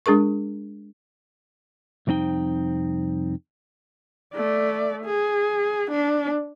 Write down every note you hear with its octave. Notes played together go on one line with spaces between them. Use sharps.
G#3 D4 G#4 A#4 C#6
C2 F2 C4 D#4 G5
A3 D5
G#4
D4